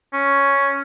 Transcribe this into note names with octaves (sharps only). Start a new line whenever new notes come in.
C#4